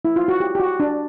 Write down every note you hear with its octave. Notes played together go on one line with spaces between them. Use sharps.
E4
F4
F#4
G4
G4
F#4
D4